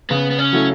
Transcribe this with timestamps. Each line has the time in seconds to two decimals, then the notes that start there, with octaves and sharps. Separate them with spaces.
0.10 C#3 B3
0.31 B3
0.39 C#4
0.53 F#3 A3 E4